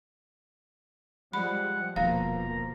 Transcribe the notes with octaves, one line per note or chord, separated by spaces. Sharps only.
F3 G3 G#3 F#5 B5
D#1 B2 F3 A#3 F5 A#5